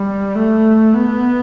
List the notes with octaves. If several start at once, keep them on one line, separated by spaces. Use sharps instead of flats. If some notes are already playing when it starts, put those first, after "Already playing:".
Already playing: G3
A3
B3